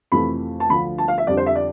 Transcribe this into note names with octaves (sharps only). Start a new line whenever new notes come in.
F2 C3 E3 A3 B5
A5
D2 D3 F3 B5
A5
F5
E5
F2 D3 G3 D5
C5
E5
D5